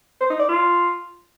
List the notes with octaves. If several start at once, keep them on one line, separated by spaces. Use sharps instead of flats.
C5
D#4
D5
F4